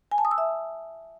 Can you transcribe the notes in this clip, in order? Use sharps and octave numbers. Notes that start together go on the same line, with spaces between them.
G#5
A5
D#6
E6
E5